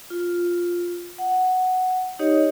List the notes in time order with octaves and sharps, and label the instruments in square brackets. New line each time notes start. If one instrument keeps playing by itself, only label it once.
[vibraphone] F4
F#5
D#4 G4 C#5 D#5